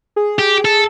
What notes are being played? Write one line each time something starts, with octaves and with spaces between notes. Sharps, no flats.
G#4
G4
A4